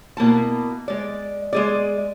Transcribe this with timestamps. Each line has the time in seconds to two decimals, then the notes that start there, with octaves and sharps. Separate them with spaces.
0.17 B2 A#3 E4 A5
0.88 G#3 D5
1.53 G#3 G#4 D5